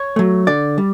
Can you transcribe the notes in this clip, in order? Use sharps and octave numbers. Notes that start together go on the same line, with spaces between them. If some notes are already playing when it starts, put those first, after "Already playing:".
Already playing: C#5
F#3 A3
D3 D5
G3